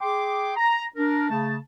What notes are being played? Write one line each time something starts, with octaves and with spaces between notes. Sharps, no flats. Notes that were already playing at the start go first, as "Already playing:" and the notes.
G#4 G5 C6 D6
A#5
D4 A#4
C#3 A3 A5